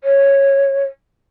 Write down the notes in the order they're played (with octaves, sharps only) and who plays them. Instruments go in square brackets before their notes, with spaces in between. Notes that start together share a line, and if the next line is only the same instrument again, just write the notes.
[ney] C#5